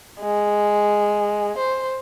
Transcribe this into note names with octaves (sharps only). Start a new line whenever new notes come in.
G#3
C5